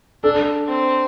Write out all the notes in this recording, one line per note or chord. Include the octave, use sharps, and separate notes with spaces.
D4 A4
C4